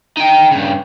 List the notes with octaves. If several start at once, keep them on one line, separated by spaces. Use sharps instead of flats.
D#4 G5
G2 C#3